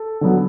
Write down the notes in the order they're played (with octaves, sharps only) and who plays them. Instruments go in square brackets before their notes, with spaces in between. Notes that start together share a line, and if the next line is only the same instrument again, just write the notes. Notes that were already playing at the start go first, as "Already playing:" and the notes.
Already playing: [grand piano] A4
D3 F#3 B3